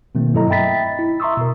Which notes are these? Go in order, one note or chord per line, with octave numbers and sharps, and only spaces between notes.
B2 D#3 A3 A#3 C4
G2 F#3 E4 A4 D#5 A#5
D#5 E5 G5 B5 A6 B6
E4
E5 A#5 C6 C#6 D#6 E6
B2 A#4